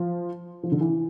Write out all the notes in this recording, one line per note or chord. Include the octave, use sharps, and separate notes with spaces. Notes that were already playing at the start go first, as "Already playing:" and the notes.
Already playing: F3
F3
D3
E3